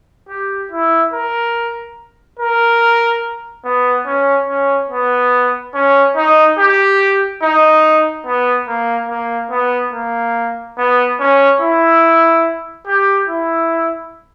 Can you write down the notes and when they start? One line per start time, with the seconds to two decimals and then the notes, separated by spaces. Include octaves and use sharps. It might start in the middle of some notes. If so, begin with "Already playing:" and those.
0.29 G4
0.71 E4
1.13 A#4
2.39 A#4
3.65 B3
4.06 C#4
4.48 C#4
4.90 B3
5.74 C#4
6.16 D#4
6.58 G4
7.42 D#4
8.26 B3
8.68 A#3
9.09 A#3
9.51 B3
9.93 A#3
10.77 B3
11.19 C#4
11.61 E4
12.87 G4
13.28 E4